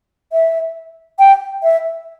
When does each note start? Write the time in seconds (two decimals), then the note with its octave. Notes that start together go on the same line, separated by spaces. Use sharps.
0.33 E5
1.19 G5
1.63 E5